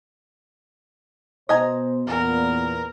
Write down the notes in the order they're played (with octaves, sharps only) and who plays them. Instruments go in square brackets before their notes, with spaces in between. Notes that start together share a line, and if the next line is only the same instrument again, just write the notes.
[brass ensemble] B2 C5 [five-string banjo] D#5 G#5 A#5
[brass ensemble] E2 A#2 B3 [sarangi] A#4